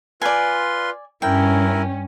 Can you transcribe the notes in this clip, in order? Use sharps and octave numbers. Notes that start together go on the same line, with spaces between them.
F4 B4 D5 G#5 C6
G2 C#4 E4 A#4 G5